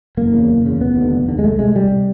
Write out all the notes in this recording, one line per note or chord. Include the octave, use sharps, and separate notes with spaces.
F#1 A#3
E2 C#3
F#1
E2 C#3
F1 B3
D#2
D3
F1
D#2 D3
G#3
C2 A3
C3 G#3
C2 G3
C3